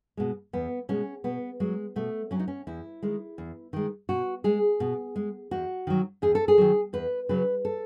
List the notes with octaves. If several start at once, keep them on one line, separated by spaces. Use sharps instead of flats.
B2 G#3
E2 B3
B2 G#3 C#4
B2 B3
F#3 G#3
B2 A3
F#3 C#4
D#4
C#4
E2 E4
D#3 G#3
E2
D#3 G#3
B2 F#4
G#3 G#4
B2
G#3
E2 F#4
D#3 F#3
E2 G#4
A4
G#4
D#3 F#3
E2 B4
C#3 F#3 B4
A4